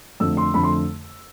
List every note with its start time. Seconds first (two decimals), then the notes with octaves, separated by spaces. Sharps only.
0.20 F2 D3 A3 E6
0.37 C6
0.54 F2 D3 A3 B5
0.63 C6